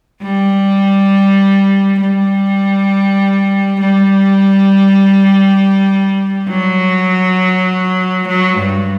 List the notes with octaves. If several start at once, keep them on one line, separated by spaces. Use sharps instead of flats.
G3
G3
G3
F#3
F#3
G2